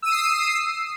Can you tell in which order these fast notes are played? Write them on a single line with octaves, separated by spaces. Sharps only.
E6 D#7 D#6 C7